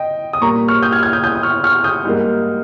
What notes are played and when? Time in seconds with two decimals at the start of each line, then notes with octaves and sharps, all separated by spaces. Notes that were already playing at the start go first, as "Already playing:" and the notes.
Already playing: D#5 G5
0.33 D#6
0.41 A#2 G3 A#3 A#5 C#6
0.68 C#6 F6
0.83 D#6 G6
0.92 F6 G#6
1.03 F6 G#6
1.13 D#6 G6
1.24 D#6 G6
1.35 D#6
1.43 C#6 F6
1.64 C#6 F6
1.84 D#6 G6
2.05 G#2 G3 A#3